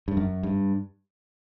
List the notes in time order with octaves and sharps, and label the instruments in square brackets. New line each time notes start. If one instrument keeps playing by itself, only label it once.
[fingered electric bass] G2
F#2
G2